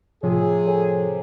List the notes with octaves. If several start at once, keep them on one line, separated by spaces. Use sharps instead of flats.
A2 C3 F3 G#4 C#5
A4 C#5 G#5